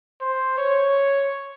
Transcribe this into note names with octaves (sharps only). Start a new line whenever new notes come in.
C5
C#5